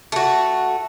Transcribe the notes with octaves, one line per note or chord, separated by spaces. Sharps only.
A3 F#4